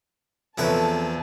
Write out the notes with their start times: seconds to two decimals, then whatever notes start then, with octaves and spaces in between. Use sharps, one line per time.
0.58 E2 F3 C4 E4 A4 B4 C#5 A5